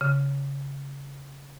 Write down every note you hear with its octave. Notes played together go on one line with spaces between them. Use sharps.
C#3